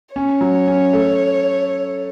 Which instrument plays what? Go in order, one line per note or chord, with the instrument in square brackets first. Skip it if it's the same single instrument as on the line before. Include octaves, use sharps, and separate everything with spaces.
[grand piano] C#4 [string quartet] C#5
[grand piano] F#3
C#4
A3